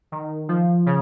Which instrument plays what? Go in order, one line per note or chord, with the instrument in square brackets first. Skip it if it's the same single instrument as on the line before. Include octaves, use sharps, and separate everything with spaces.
[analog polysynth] D#3
F3
C#3